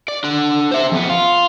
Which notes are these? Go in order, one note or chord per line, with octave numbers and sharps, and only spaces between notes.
D5
D4 F#5
C5 E5
F2 B3
F4